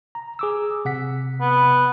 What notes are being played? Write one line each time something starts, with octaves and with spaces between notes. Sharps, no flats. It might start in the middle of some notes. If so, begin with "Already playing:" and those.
A#5
G#4 D6 E6
C3 F#5 B6
B3